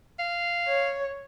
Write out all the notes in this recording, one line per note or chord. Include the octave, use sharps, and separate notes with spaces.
F5
C#5